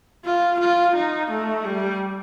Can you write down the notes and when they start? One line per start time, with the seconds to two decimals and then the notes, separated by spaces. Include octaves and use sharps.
0.25 F4
0.60 F4
0.95 D#4
1.31 A3
1.65 G3